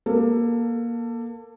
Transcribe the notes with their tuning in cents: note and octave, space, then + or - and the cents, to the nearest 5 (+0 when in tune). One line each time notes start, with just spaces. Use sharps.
A#3 +15 A4 +25